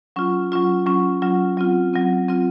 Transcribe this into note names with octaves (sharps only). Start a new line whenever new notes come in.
F#3 C#4 F4
F#3 C#4 F4
F#3 C#4 F4
F#3 C#4 F4
F#3 C4 F4
F#3 C4 F4
F#3 C4 F4